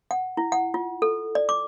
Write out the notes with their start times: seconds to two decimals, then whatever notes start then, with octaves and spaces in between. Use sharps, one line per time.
0.11 F#5
0.37 E4
0.52 F#5
0.74 F4
1.02 A4
1.35 D5
1.49 D6